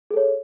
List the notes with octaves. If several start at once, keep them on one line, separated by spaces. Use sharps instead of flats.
G#4 A4 C#5